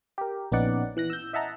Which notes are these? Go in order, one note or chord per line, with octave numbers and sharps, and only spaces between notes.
G4 A#4
A#1 B3 C#4 D#4 D5 F#5
E3 F#6 A#6
E6 G6
D#5 E5 F#5 A5 A#5